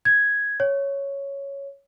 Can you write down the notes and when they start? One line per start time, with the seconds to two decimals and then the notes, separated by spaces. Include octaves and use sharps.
0.05 G#6
0.60 C#5